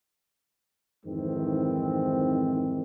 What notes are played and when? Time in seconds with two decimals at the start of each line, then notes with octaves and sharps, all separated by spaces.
1.06 F2 G#2 D#3 E3 C4